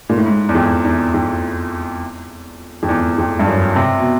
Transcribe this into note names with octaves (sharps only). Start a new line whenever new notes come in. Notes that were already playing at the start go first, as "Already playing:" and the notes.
A#2
A2
G#2
E2
F2
E2
F2
F2
E2
F2
G2
F#2
C3
B2